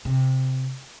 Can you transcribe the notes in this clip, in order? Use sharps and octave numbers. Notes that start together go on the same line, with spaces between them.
C3